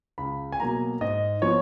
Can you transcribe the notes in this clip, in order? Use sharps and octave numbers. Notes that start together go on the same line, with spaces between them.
C#2 B5
G#5
B2 F#3 A#3 A#5
G#2 D#5
F3 B3 C#5